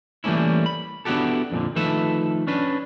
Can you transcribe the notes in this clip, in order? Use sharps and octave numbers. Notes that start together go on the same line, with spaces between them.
E3 G3 A3 A#3 C#4 E4
B5
B3 D4 E4 F#4 G4 A4
F2 A#2 D3
D#3 F3 A3 A4 B4 E5
C#4 D4 B4